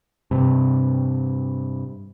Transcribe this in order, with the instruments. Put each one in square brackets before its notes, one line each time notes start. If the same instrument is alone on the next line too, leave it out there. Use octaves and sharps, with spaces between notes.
[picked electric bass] G2 C3